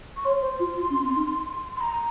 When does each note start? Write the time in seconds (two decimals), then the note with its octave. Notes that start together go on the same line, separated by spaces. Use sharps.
0.17 C#6
0.25 C#5 C6
0.42 C5
0.60 F4
0.77 F4
0.90 C#4
1.03 C4
1.15 D#4
1.77 C6
1.81 A#5